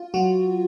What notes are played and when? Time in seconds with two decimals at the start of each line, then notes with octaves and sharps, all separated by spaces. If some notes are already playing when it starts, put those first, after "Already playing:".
Already playing: F4
0.14 F#3 F#4